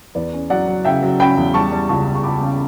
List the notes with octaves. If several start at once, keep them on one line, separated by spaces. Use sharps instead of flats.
E2 B4 D5
C#4
F#3 D5 F#5
F#3
C#3 E5 G5
F#3
C#4 G5 B5
E2
G3 A5 C#6
G3
C#2 A5 C#6
C#2
C#6
C#2 B5 D6
C#3